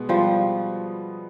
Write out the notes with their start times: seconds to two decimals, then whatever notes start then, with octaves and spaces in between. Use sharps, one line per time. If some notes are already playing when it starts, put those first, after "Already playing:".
Already playing: B2 G#3 B3
0.09 F3 G3